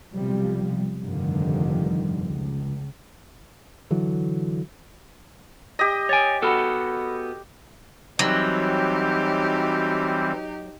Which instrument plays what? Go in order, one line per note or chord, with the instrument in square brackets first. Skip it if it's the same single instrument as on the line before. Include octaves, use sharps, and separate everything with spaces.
[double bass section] B1 C3 F3 G3
F1 G2 D3 D#3 F3 G3
C#2
[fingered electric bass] D3 E3 F#3
[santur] G4 D#5
[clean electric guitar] C#5 G#5 [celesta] A6 D7
[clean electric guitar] B3 F#4 A4 [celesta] F#5 B5 F6
[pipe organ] E3 G3 C4 [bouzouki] F#3 [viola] D#4 G4